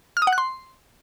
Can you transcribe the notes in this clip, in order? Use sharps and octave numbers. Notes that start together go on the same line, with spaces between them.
F6
D#6
F#5
F#6
C6